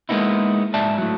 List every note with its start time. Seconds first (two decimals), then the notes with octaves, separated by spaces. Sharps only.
0.09 G#3 A#3 B3 D#4 E4
0.74 G#2 D5 E5 A5
0.98 A2 F#3